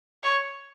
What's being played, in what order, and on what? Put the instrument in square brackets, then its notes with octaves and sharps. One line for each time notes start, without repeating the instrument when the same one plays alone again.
[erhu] C#5